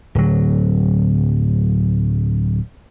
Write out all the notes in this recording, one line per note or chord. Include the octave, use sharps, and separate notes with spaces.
D1 F#3